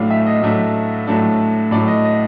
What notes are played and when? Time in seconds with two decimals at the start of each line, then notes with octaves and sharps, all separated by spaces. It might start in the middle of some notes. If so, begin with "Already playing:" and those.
Already playing: A2 F#3 A3 D4 F5
0.11 E5
0.26 D#5
0.42 A2 F#3 A3 D4
1.07 A2 F#3 A3 D4
1.71 A2 F#3 A3 D4 D5
1.88 D#5
2.04 D#5